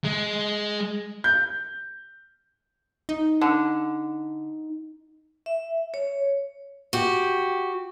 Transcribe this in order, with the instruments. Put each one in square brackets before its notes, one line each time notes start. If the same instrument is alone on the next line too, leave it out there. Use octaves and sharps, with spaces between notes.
[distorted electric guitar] G#3
[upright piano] G6
[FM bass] D#4
[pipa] D3
[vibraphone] E5
C#5
[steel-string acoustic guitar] F#4 G4